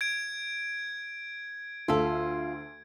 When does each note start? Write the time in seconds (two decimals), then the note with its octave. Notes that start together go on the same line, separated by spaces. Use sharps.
0.01 G#6 D7
1.88 D2 F4 A4 E5